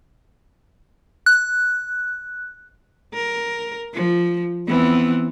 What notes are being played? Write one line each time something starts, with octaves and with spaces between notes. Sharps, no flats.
F#6
A#4
F3
E3 B3 C4